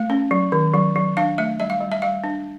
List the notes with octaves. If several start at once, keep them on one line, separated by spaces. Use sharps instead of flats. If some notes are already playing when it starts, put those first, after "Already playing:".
Already playing: A3 F5
C#4
F#3
D#3
F#3
F#3
D4 F5
A3 E5
G3 E5
F5
G3
E5
G3 F5
D4